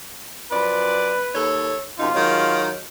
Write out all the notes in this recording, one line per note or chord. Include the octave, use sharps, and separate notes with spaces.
F#2 F3 B4 D5
D#2 A4 C#5
F#2 C3 D#4 F4
D#3 F#3 G#3